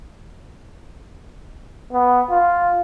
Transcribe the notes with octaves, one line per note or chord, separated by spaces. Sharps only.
B3
F4